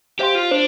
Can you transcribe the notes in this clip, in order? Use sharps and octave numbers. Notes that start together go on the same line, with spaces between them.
G4 C5 F5 C6
F4
D4 C5